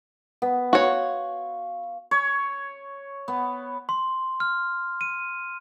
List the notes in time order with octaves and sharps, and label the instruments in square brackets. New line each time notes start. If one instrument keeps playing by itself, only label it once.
[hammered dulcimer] B3
[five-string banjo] F#4 C#5 [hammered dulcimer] F5 C6 C#6
[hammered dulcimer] C#5
B3
[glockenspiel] C6
F6
D#7